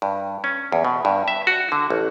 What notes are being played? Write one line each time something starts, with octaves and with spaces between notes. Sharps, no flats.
G2
C#4
E2
B2
G2
E5
F#4
D3
A1